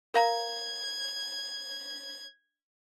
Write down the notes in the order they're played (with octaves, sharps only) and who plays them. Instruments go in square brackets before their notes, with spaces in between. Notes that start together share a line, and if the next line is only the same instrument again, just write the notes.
[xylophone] A#4 F5 A#5 [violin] G#6